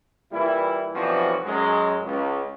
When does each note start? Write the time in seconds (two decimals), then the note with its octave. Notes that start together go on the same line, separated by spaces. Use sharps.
0.32 A#2 E3 G3 E4
0.94 B1 E3 F3 G3 C4 F#4
1.45 F#2 G#3
2.05 C#2